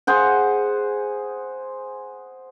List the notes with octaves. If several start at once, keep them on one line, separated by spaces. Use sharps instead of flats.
G#4 C5 F#5